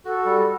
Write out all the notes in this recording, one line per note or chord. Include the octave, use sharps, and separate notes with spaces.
F#4 A4
G3